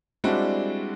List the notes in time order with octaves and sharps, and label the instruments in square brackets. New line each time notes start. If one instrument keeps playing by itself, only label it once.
[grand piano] G3 G#3 C4 D4 E4 F#4